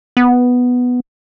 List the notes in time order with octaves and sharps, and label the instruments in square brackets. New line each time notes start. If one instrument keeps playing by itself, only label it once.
[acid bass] B3